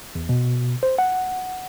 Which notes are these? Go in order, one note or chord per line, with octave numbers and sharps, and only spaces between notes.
E2
B2
C5
F#5